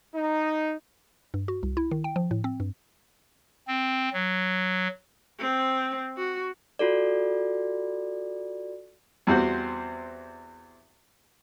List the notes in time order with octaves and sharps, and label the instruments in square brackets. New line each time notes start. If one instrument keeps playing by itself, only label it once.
[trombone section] D#4
[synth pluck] G2
F#4
C2
E4
D#3
G5
F3
A2
C4
G2
[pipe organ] C4
F#3
[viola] C4
F#4
[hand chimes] F4 F#4 A4 D5
[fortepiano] E2 G3 C4 F#4 C5